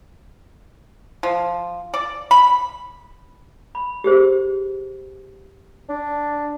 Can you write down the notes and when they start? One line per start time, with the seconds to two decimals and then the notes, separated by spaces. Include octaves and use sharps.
1.23 F3
1.94 D5
2.31 B5
3.75 B5
4.04 G4 G#4 C5
5.89 D4